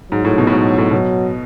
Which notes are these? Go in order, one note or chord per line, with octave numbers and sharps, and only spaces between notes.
G#2 F#3
A2
B2
A2
G#2 F#3
A2
B2 F#3